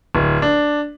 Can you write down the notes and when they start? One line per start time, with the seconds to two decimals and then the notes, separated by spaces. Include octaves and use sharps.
0.15 D1
0.42 D4